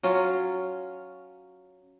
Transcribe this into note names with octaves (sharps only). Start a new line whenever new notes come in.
F#3 C#4 F4 C#5